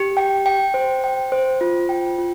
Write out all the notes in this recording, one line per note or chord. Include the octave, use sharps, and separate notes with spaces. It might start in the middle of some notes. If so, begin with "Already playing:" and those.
Already playing: G4
G5
G5
C5
G5
C5
F4
G5
F4